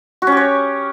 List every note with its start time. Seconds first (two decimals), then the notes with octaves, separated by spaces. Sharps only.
0.22 F#4
0.27 C#4
0.32 G4
0.37 C#5